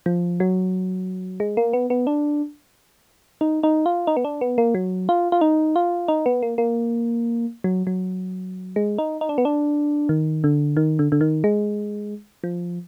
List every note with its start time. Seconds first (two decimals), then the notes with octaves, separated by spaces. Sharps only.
0.06 F3
0.40 F#3
1.40 G#3
1.57 A#3
1.73 B3
1.90 B3
2.07 D4
3.41 D#4
3.63 D#4
3.86 F4
4.07 D#4
4.17 B3
4.25 D4
4.41 B3
4.58 A#3
4.75 F#3
5.09 F4
5.32 F4
5.41 D#4
5.76 F4
6.08 D#4
6.26 B3
6.43 A#3
6.58 A#3
7.64 F#3
7.87 F#3
8.76 G#3
8.99 D#4
9.21 D#4
9.29 D4
9.38 B3
9.45 D4
10.09 D#3
10.44 D3
10.77 D#3
10.99 D3
11.12 D3
11.21 D#3
11.44 G#3
12.44 F3